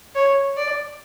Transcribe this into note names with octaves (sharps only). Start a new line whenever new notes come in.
C#5
D5